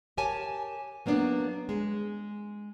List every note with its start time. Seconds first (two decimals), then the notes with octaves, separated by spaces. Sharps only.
0.17 G4 A#4 C#5 G#5 A5
1.06 F#3 A#3 B3 D4
1.69 G#3